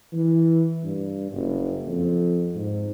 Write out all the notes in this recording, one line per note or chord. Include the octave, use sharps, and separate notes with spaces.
E3
G2
F#1
F2
G#2